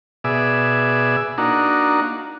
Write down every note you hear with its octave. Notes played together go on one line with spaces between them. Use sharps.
B2 G#4 D5 E5
A#3 D4 D#4 F#4